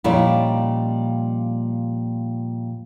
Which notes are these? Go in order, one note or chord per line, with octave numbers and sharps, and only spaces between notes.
A#2 F3 G3 C#4 D#4 E4